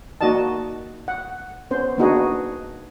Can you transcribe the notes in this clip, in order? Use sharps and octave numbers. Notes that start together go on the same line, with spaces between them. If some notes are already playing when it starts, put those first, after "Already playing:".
A#3 D#4 F#4 D5 D#5 A5
F#5
B3 C#4 C5
A#3 B3 D4 D#4 F#4 G#4